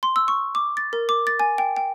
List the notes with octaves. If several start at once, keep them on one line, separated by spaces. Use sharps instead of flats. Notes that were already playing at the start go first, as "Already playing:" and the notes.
C6
E6
C#6
D6
A6
A#4
D6
A6
G#5
G5
G5